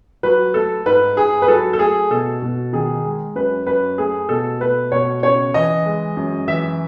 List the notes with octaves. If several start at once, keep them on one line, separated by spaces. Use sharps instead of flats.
F#3 B4
A3 A4
G#2 B4
G#2 G#4
B4
F#3 A4
A4
A3 G#4
B2 A4
B2
D#3 G#4
G#3
F#2 B4
F#2 B4
A3 G#4
B2 A4
A3 B4
B2 C#5
C#3 C#5
E3 D#5
G#3
F#2
E3 E5